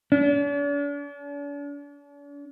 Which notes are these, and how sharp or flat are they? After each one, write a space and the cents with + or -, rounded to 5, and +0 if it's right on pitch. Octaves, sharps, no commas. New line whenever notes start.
D4 -45